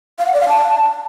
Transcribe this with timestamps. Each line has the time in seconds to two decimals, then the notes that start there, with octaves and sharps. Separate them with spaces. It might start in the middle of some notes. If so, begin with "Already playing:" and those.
0.19 F5
0.26 F#5
0.34 D5
0.41 F5
0.48 A5